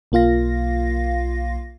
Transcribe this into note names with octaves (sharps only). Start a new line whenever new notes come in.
B1 A#3 F4 F5 A#6